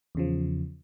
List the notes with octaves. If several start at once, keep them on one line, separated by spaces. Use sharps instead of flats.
E2 C#3 F3